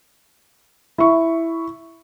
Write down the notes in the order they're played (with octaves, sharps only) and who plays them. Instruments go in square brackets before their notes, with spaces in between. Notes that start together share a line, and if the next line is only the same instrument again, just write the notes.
[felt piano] E4 C#6